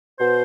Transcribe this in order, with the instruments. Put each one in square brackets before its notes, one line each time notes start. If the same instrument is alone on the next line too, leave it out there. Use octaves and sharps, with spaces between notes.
[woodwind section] B2 C5